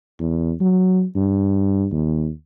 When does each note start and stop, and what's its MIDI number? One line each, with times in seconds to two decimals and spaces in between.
0.20 0.52 40
0.60 1.04 54
1.16 1.86 43
1.92 2.30 39